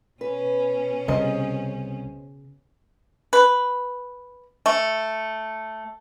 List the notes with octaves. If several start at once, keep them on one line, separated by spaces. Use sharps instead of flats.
B2 C#4 B4
C2 C#3 C5 D#5
B4
A3